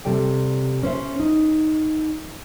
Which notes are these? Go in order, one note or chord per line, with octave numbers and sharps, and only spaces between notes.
C3 G3 A4 D5 G5
C#4 C5 E5
D#4